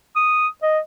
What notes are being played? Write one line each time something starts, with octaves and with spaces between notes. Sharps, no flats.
D#6
D#5